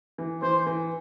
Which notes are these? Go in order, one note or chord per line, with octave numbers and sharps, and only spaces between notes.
E3
E3 C5
E3